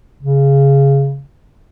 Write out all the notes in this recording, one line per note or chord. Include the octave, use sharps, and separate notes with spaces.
C#3